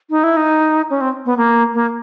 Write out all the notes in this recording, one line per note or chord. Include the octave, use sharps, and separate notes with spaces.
D#4
E4
D#4
C#4
C4
B3
A#3
A#3